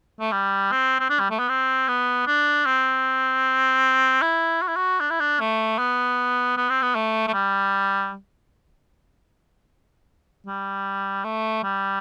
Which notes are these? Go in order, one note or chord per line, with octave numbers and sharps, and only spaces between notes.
A3
G3
C4
C4
D4
G3
A3
B3
C4
B3
D4
C4
E4
F#4
E4
F#4
D4
E4
D4
A3
B3
B3
C4
B3
A3
A3
G3
G3
A3
G3